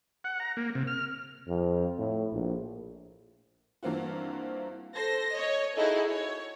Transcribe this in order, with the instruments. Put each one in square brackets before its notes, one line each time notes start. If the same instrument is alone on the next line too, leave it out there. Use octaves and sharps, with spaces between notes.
[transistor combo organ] F#5
A#5
A#3
C3
F6
[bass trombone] F2
A2
A#1
[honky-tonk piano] G2 E3 A#3 C4 F4 F#4
[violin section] A4 C5 A#6
C#5 D#5
D#4 E4 F#4 G#4 A4 D#5
C#5